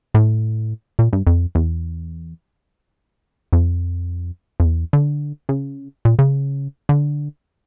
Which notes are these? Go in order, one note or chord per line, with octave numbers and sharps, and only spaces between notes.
A2
A#2
G2
F2
E2
F2
F2
E2
D3
C#3
A#2
C#3
D3